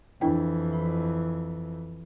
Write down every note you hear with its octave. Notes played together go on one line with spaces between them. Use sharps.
F2 E3 D4 E4 G5